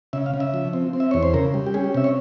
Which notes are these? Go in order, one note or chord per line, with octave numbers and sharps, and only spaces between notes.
C#3 E5
F5
C#3
E5
F3
C4
C4
E5
E2 C#5
C5
C#3 A#4
G3
G4
C#4 G#4
G4
C3 E5
C#5